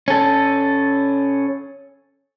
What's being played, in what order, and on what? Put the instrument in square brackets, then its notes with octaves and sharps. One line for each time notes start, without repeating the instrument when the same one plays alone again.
[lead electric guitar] C#4 A4